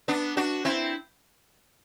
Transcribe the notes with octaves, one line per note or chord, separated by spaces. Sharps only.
B3 D4
D4 F#4
C4 E4